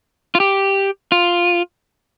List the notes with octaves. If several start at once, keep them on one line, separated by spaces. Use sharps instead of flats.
F4
G4
F4